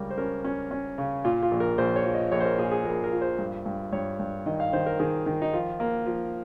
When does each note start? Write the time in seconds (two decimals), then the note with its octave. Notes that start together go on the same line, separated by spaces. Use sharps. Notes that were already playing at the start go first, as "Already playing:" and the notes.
Already playing: C#2 C#3 G3 A#4
0.10 C5
0.18 C#4 A#4
0.44 C#4
0.71 C#4
0.98 C#3
1.24 A#2 F4
1.43 F4
1.51 A#1
1.60 A#4
1.78 A#1 C5
1.96 C#5
2.05 F3
2.14 D#5
2.32 A#1 C#5
2.40 C5
2.45 A#4
2.59 A#2 G#4
2.72 G#4
2.85 A#1 A#4
3.04 A#4
3.12 F3
3.21 C5
3.39 G2
3.66 G2
3.92 G2 C#5
4.19 G2
4.46 D#3 D#5
4.60 F5
4.73 D#3 C5
4.86 A#4
4.99 D#3 G#4
5.26 D#3
5.42 D#4
5.53 F3 F4
5.80 A#3
6.06 F3